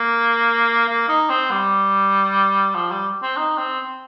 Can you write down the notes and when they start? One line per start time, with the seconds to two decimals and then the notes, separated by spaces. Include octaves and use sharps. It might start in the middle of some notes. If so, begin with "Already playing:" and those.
Already playing: A#3
0.88 A#3
1.09 D#4
1.30 C4
1.51 G3
2.75 F3
2.91 G3
3.22 C4
3.37 D#4
3.58 C4